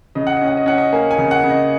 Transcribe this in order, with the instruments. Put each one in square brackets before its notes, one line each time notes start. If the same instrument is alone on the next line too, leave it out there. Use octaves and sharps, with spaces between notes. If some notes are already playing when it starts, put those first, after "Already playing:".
[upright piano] C#3 D#5
F#5
C#4 D#5
F#5
D#5
C#4 F#5
D#5
A#3 G#5
G#5
C#3
F#5
C#3
D#5